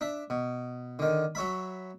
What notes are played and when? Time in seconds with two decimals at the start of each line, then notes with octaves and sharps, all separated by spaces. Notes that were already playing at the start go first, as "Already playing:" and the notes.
0.01 D4 E5
0.30 B2
0.99 D3 D#3
1.35 F#3 C#5 E5 B5